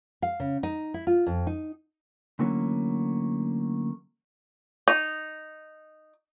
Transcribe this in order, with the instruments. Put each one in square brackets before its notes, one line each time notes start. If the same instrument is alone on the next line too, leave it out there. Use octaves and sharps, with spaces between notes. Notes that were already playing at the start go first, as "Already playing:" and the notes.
[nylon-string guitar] F5
C#3
D#4
E4
F4
F2
D#4
[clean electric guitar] D3 E3 F#3 A3 A#3 C#4
[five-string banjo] D#4